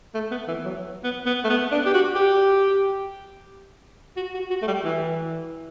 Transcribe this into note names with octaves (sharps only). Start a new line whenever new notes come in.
A3
B3
E3
F#3
B3
B3
A3
B3
D4
G4
F#4
G4
F#4
F#4
F#4
A3
G3
E3